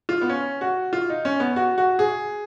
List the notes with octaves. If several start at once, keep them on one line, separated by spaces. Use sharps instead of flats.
F4
B3
C#4
F#4
F4
D#4
C#4
B3
F#4
F#4
G#4